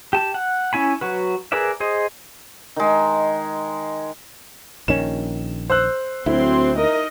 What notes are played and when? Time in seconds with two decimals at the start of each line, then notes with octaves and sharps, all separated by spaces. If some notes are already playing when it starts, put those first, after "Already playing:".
0.13 G4 A5
0.34 F#5
0.73 C#4 E4 G#5 B5
1.01 F#3 F#4 B4
1.52 G#4 A#4 B4 D5 E5
1.80 G#4 C5 D#5
2.76 D#3 G#3
4.88 A#1 D#3 C#4 E7
5.70 C5 E6 F#6
6.26 D2 F#3 C4 E4 C6
6.77 D#4 A#4 D#5